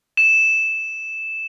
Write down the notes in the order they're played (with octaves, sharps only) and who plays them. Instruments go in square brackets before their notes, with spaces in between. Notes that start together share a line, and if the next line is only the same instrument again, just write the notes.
[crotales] E7